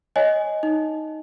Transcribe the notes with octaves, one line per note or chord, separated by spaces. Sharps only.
C#5 D#5 G#5
D#4